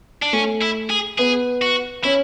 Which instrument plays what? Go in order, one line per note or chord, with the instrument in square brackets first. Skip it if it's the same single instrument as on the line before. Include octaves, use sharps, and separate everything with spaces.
[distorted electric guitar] D4
[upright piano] A3 [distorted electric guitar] C#4
[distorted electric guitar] E4
G#4
[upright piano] B3 [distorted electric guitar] G#4
[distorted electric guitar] F#4
[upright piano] C#4 [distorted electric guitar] E4